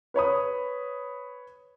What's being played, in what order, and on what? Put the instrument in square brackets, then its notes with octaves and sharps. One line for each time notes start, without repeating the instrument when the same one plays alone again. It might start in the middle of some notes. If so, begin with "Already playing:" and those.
[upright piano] B4 C#5 B5 D#6